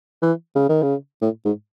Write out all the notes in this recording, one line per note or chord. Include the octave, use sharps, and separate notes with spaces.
E3
C#3
D#3
C#3
A2
G#2